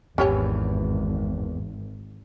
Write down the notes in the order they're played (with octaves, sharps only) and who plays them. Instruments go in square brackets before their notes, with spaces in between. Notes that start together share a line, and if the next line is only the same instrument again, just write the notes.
[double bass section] G#1 [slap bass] E2 E3 [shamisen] C#4 G4 C#5